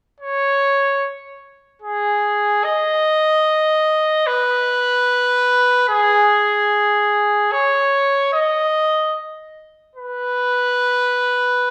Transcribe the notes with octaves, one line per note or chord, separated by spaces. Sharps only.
C#5
G#4
D#5
B4
G#4
C#5
D#5
B4